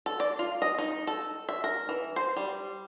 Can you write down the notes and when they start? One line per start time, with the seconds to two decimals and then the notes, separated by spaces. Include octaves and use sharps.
0.06 A4
0.20 D5
0.39 F4
0.62 D#5
0.78 D#4
1.07 A4
1.49 E5
1.64 A#4
1.89 E3
2.16 C5
2.36 G3